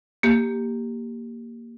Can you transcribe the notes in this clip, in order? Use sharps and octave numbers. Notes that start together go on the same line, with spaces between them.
A#3 G4